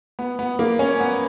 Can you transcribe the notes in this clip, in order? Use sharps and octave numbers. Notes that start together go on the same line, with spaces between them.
B3
B3
A#3
C#4
B3